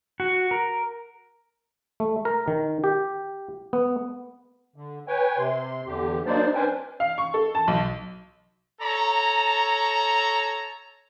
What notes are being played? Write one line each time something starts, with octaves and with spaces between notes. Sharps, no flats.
F#4
A#4
A3
A#4
D#3
G4
B3
D3
B4 C#5 G5 G#5
C3 C6
E2 D3 G4
F#3 A#3 D4 D#4 C5 D5
C#4 D4 B4 C5 G5 G#5
F5
C#6
A4
A5
B1
A4 C#5 A#5